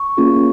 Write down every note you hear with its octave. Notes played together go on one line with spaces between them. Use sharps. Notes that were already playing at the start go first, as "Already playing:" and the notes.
Already playing: C#6
A#3 C#4 F4 G#4